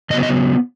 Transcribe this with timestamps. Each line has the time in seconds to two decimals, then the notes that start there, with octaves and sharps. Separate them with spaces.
0.10 C#3 F#3 B3 D#5
0.23 D#5